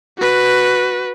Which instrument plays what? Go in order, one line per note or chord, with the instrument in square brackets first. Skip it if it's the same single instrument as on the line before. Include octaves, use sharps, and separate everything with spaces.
[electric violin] F#4 B4